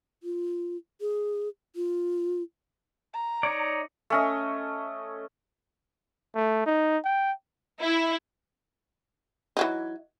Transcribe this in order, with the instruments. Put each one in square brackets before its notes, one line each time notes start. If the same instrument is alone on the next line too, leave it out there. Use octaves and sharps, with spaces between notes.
[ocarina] F4
G#4
F4
[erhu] A#5
[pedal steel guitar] D#4 C#5 D5
[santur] A3 C#4 D#5
[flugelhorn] A3
D#4
G5
[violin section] E4
[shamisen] E3 F#3 D#4